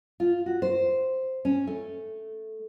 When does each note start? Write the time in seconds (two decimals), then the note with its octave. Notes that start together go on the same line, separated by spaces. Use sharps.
0.20 F4
0.46 F#4
0.62 C5
1.45 C#4
1.67 A3